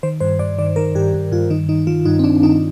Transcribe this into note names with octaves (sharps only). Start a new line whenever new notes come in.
D#3 C5
G2 C5
G2 D5
D#3 D5
D#3 A#4
G2 G4
G2
G2 F4
D#3 D#4
D#3 D#4
D#3 F4
G2 D#4
C4
D#3 D4
D#3 D#4